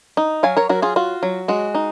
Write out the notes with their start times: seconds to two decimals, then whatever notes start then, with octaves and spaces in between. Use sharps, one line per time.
0.17 D#4
0.43 F#3 F5 G#5
0.57 A#4 C#5
0.69 F#3 F#4 A#4
0.82 F4 G#4
0.96 F4 F#4
1.23 F#3
1.48 G#3 F#4
1.75 D#4